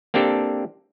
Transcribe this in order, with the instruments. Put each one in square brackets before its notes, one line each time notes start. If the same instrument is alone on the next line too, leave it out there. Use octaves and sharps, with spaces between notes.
[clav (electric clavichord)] A#3 C4 D4 G4 A4